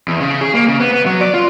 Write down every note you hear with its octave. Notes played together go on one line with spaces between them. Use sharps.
E2
C#3
G#4
A#3
C#3
B3
B3
F#3
D5
F4